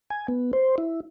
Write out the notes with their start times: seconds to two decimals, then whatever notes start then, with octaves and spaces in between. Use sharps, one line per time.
0.10 G#5
0.28 B3
0.53 C5
0.78 E4